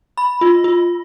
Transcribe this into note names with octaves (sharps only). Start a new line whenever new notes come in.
B5
F4
F4